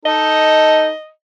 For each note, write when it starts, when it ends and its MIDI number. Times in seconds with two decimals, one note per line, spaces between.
0.06 0.90 63
0.06 0.90 69
0.06 1.10 75